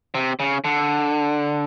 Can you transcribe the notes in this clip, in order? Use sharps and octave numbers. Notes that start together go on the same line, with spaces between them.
C3
C#3
D3